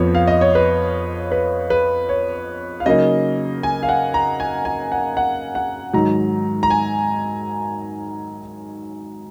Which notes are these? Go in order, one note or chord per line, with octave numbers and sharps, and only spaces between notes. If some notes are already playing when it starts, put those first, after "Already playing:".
Already playing: F2 F3 B3 C#5
F5
D#5
C#5
B4
B4
B4
C#5
F5
C#3 F#3 A#3 D#4 D#5
G#5
F5
F#5
A#5
G#5
G#5
F#5
F#5
F#5
G#2 D#3 F#3 A#5
A#5
G#5